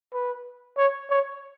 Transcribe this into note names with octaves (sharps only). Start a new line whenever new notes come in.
B4
C#5
C#5